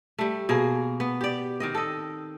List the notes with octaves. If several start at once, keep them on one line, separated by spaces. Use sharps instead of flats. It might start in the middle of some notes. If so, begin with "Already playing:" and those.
G3 A3
B2 A#3 G#4
B3
G4 D5
D#3 C4 D#5
A4 D#5